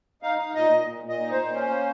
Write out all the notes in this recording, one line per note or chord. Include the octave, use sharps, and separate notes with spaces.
D#4 F5
D#4
A#2 D#5
A#2
A#2
A#2
D#5
D#4
A#2 C5
C#4
A#3